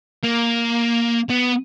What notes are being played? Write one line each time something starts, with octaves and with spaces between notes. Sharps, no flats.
A#3
B3